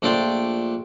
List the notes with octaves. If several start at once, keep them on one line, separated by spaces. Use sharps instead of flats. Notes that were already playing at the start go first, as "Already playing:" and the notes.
A#1 A3 D4 F4 D5 G5